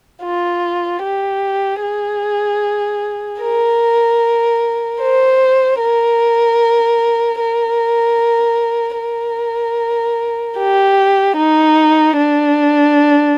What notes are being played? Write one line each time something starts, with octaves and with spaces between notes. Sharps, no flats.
F4
G4
G#4
A#4
C5
A#4
A#4
A#4
G4
D#4
D4